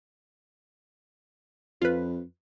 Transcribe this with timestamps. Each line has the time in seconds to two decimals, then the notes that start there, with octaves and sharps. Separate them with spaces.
1.82 F2 F4 B4